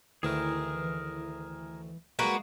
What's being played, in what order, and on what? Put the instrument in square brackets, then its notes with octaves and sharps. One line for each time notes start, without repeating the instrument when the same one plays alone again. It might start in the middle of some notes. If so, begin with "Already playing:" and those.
[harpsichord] D2 D#3 A3 [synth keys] E3 [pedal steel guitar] G#4 A#4
[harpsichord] G3 G#3 D#4 [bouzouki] A#3 B3 F#4